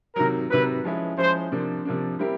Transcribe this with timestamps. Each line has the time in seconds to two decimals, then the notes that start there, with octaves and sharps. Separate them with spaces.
0.16 C3 D#3 F#3 A#4
0.50 C3 D#3 F#3 B4
0.84 F3 G#3 C#4 E4
1.18 F3 G#3 C#4 E4 C5
1.52 C3 F3 A#3 D4
1.85 C3 F3 A#3 D4
2.19 G3 C4 E4 G4 A#4